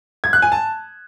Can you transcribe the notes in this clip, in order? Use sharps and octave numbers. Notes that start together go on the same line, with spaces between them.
G#6
F#6
G#5
A5